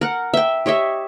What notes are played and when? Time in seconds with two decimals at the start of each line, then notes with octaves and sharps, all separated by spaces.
0.01 A#4 F#5
0.34 E5 G5
0.66 G4 C#5 D#5 E5